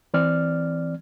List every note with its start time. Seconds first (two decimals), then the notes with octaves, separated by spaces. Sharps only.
0.14 E3 C4 D5 F6